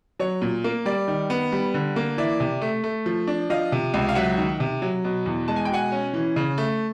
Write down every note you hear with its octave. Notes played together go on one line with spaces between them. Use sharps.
F#3 C#5
A#2
A#3
G3 D5
D#3
B3
G3
D3
A#3
E3 D5 E5
C3
A3
A3
F3
D4
F3 D#5 F5
C3
C#2
F5
F#3 E5 F#5
D#3
C3
F#3
B2
E2
G#3 A5
G#5
G5
B2 F#5 G#5
C#4
E3
C#3
A3